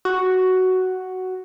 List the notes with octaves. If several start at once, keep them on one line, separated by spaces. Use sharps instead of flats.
F#4